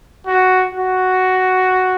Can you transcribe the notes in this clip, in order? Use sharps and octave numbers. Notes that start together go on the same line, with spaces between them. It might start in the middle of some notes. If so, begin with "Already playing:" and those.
F#4
F#4